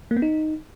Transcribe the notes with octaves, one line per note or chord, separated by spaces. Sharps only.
A#3
B3
D#4